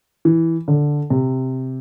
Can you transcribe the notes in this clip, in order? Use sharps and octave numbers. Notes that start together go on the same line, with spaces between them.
E3
D3
C3